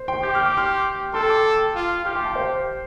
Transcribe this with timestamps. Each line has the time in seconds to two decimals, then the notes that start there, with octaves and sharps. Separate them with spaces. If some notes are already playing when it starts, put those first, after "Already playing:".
Already playing: C5
0.08 G5 C6
0.23 G4 G6
0.35 F6
0.45 D6
0.57 C6 F6
1.14 A4 G5 C6
1.30 A5 D6
1.75 F4
2.05 G4 C6 F6
2.15 G5 C6
2.25 F5 A5
2.35 C5